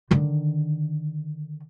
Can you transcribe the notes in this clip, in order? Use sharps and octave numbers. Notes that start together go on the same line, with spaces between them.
D3 D#3